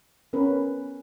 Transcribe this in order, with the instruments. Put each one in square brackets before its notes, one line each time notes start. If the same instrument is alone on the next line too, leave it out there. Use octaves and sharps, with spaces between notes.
[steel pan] B3 C#4 A#4 B4